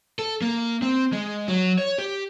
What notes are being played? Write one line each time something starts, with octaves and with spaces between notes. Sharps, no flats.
A4
A#3
C4
G#3
F#3
C#5
G4